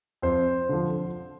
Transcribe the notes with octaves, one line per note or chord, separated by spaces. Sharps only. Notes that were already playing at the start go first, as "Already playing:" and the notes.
F2 C5
D3 F3